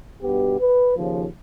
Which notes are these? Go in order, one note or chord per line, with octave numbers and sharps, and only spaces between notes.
G2 B2 B3 G4
B4
D#2 C#3 F3